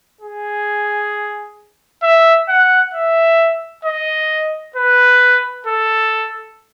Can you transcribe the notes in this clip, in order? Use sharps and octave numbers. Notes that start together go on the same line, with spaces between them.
G#4
E5
F#5
E5
D#5
B4
A4